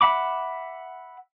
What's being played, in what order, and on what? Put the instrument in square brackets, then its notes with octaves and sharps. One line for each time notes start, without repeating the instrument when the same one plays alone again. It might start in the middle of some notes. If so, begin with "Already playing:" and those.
[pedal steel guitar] E5 F#5 B5 D6